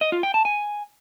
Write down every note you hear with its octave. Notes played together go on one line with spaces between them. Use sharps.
D#5
F4
G5
A5
G#5